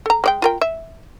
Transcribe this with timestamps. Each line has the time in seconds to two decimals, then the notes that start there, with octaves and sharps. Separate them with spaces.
0.06 A4 A#5
0.24 G#3 D5 G5
0.42 F4 A#4 G5
0.61 E5